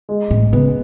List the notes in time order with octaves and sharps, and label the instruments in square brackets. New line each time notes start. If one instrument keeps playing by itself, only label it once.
[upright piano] G#3
[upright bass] A2
[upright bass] C#3 [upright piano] B3